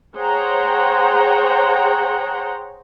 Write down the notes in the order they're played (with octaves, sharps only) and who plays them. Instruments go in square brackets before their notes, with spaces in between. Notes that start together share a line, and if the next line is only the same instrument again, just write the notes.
[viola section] G#4 C5 C#5 F#5 G5 A#5